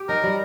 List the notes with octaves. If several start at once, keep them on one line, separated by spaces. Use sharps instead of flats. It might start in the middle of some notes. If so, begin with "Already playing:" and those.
Already playing: G4
D#4 A#4
G3